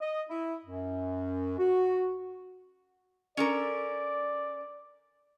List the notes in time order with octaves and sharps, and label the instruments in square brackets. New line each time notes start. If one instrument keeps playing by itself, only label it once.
[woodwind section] D#5
E4
F#2
F#4
[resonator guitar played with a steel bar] C#4 A4 A#4 [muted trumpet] D5